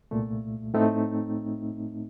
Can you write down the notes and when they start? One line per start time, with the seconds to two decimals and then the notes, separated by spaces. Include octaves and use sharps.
0.11 C2 A#2 A3
0.74 A2 A3 C4 D#4